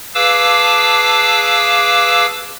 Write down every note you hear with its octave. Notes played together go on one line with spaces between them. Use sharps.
G#4 B4 F5 A5 D6 E6